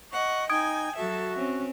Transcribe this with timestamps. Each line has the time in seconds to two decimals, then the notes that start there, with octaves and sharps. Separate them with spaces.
0.12 D#5 F#5 C#6
0.50 D#4 G5 G#5 D#6 G#6 D7
0.96 F#3 F#4 A4 E5
1.37 C4 C#4